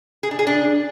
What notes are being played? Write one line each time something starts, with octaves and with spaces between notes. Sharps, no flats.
G#4
D4
G#4
D4